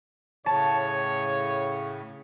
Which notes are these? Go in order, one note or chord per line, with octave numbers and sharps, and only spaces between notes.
A2 C#3 C#5 A5